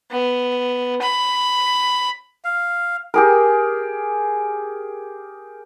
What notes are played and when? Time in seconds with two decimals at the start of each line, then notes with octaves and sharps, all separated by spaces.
0.11 B3
1.01 B5
2.44 F5
3.14 G4 G#4 A#4